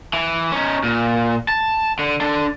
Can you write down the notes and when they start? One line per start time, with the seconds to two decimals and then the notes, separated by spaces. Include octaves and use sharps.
0.13 E3
0.52 C#4 D#4
0.84 A#2
1.48 A5
1.99 D3
2.21 D4 A4